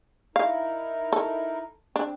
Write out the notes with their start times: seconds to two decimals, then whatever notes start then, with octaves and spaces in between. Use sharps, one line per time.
0.36 D#4 E4 A#4 F5
1.13 A4
1.96 C4 D4